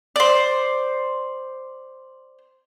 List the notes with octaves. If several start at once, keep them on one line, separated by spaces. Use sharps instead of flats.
C5 D5